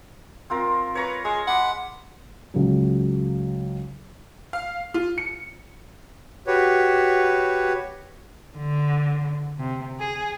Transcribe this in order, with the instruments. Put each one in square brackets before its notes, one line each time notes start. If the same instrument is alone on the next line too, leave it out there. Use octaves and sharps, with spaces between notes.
[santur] C4 F4 A#4
[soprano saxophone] B4 [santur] C#5 A#5 C#6
[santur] G#3 [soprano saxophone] G#4
[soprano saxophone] F#5 [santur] B5 D6
[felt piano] C#2 F#3
[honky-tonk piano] F5
F4
C#7
[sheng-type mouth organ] F#4 G4 B4 C#5
[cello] D3
C3
G#4